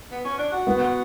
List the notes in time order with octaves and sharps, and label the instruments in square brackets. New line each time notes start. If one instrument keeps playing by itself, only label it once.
[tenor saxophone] B3
C#4
D4
F#4
[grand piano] B3